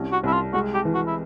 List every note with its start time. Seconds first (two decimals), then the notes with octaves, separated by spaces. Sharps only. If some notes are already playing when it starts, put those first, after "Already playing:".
Already playing: C2 C#4
0.12 F#4
0.24 C2 E4
0.33 F4
0.53 G#3 F#4
0.74 G4
0.85 E3
0.95 F#4
1.07 E4